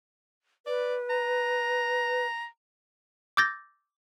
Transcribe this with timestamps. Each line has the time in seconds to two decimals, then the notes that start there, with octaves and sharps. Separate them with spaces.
0.66 B4 D5
1.10 A#5
3.37 D6 E6 G6 A6 A#6